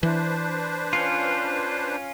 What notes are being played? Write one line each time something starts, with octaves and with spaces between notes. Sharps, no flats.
E3 D4 B4 C5
C#4 F4